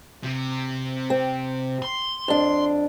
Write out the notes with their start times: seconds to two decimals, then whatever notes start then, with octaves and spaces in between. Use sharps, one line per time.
0.23 C3
1.10 C4
1.82 C6
2.28 F2 D4